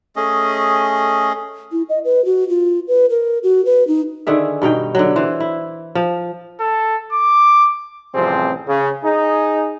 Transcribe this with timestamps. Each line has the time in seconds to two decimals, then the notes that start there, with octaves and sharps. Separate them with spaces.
0.16 A3 C#4 G#4 D#5
1.72 E4
1.89 D#5
2.05 B4
2.25 F#4
2.49 F4
2.88 B4
3.10 A#4
3.43 F#4
3.65 B4
3.88 D#4
4.27 D3 D#3 G#4 E5
4.62 G2 B2 D#4 G5
4.95 D3 F#3
5.16 E3 C5
5.40 E4
5.95 F3
6.60 A4
7.12 D6
8.15 A1 C3 F3 G3 C4 G#4
8.68 C#3
9.04 D#4 G#4